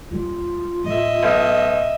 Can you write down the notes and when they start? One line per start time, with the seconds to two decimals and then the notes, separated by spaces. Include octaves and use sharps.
0.11 D#1 G3 F4
0.84 A2 D#5 E5
1.23 B1